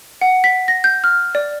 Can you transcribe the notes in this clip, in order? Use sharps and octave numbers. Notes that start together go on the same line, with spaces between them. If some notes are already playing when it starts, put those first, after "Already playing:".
F#5
B6
A#6
G6
F6
D5